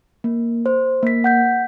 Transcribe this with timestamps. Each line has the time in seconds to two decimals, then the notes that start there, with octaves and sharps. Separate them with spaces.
0.24 A#3
0.66 C5
1.03 A#3 B6
1.24 F#5 G6 B6